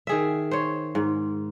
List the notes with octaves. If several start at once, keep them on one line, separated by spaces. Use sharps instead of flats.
D#3 G#4 E5
C5 C#5
G#2